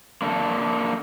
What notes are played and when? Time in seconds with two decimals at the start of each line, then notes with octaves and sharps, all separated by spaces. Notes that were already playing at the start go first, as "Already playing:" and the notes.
0.22 A#3 D4 A4